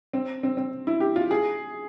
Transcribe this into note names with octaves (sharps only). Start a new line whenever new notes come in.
C4
C4
C4
E4
G4
F4
G#4